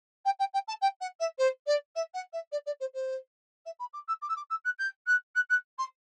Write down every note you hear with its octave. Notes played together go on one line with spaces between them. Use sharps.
G5
G5
G5
A5
G5
F#5
E5
C5
D5
E5
F#5
E5
D5
D5
C5
C5
E5
B5
D6
E6
D6
E6
D6
E6
F#6
G6
F#6
F#6
F#6
C6